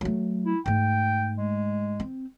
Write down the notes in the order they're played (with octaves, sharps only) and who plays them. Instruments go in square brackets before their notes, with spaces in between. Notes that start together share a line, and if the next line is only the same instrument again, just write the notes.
[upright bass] F#3 A3
[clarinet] E4
[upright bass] G#2 A3 [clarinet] G5
[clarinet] G#3
[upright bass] C4